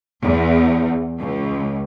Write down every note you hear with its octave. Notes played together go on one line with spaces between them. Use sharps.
E2
C#2